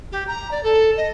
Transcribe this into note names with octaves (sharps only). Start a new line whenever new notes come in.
G4
A#5
D5
A4
D#5